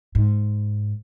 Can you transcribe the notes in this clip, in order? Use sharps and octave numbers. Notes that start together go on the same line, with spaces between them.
G#2